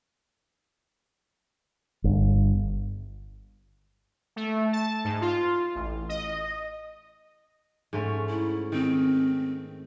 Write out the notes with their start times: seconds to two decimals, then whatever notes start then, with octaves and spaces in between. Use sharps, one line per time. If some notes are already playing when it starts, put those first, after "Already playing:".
2.04 G1
4.36 A3
4.73 A5
5.04 G#2
5.21 F4
5.75 A1
6.09 D#5
7.93 G#2 A3 C#4
8.29 E4
8.72 D#3 C4